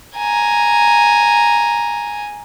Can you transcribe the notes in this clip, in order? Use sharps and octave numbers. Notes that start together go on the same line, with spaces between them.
G#5 A#5